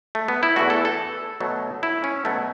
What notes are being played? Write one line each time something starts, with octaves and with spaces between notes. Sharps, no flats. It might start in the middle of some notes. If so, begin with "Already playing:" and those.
A3
B3
E4
E2 E3 A3 F#4
A4
A4
B2 F#3 A3
E4
C#4
B2 F#3 A3